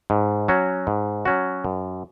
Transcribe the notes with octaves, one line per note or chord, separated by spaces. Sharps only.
G#2
F#3 C#4 F#4
G#2
F#3 C#4 F#4
F#2